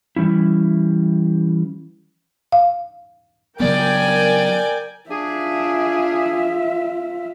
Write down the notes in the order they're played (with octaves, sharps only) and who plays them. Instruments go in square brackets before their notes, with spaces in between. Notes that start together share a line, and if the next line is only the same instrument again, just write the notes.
[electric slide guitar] E3 G3 C#4 E4
[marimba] F5
[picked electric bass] C#3 F#3 B3 [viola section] A#4 G5 G#5 [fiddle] D5
[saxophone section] D4 G#4 [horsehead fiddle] F4 E5